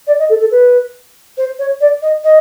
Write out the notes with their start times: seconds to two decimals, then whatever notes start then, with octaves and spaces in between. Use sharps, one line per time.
0.07 D5
0.19 D#5
0.29 A4
0.40 A4
0.51 B4
1.38 C5
1.59 C#5
1.81 D5
2.02 D#5
2.24 D#5